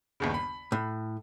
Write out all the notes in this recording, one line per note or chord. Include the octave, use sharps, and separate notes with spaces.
G1 D#2 C#3
B5
A2